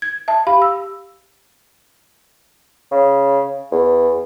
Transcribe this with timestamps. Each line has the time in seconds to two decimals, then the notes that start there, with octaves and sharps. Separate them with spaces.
0.02 G#6
0.28 E5 A5
0.47 G4 F5 B5
0.62 E6
2.91 C#3
3.72 E2